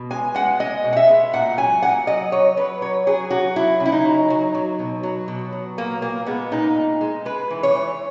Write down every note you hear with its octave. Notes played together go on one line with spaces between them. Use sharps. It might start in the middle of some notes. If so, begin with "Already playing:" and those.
Already playing: B2
G#3 G#5
G#3 F#5
G#3 D#5
B2
F#5
E5
G#3
A#2 F#5
F#3 G#5
A#2 F#5
F#3 D#5
F#3 C#5
F#3 B4
F#3 C#5
F#3 G#4
F#3 F#4
F#3 E4
C#3
E4
D#4
F#3
F#3
F#3
B2
F#3
B2
F#3
A#2 A#3
A#2 A#3
G#3 B3
A#2 D#4
A#2
G#3
G#3 B4
E3
C#5
E3